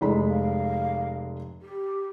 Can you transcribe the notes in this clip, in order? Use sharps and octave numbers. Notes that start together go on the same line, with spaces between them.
F1 G#3 B5
F5
G4